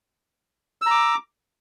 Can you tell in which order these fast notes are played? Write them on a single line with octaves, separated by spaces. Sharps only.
E6 A#5 D6